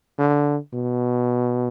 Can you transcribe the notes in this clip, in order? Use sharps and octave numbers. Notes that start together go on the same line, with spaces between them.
D3
B2